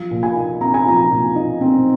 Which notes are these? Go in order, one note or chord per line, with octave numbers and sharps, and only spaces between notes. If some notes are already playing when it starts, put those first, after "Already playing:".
Already playing: F3
A#2
G#5
D#4
C4 A#5
G#5
F3 A#5
A#2
D#4
C4